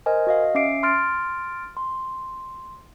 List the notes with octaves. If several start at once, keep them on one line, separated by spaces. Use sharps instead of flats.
A#4 C5 D#5 G#5
F#4 D#5 F5
C#4 E5 D6 C7 D7
C6 F6 A6 D7
C6